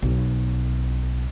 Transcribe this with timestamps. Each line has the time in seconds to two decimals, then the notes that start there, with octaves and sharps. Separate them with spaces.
0.02 B1